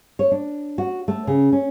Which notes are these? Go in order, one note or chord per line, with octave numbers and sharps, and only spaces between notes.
C#5
D4
F#4
A3
C#3
C#4